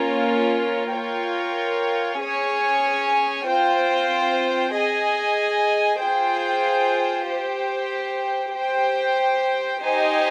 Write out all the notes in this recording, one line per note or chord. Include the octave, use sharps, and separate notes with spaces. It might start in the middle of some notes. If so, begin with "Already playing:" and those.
Already playing: A#3 C#4 F4 A#4 C#5
F4 A#4 C#5 G5
C#4 G#4 C#5 G#5
C4 F4 C5 G5
G#4 D#5 G#5
F4 G#4 C5 G5
G4 C5 G5
G4 C5 G5
D#4 G4 C5 D#5 G#5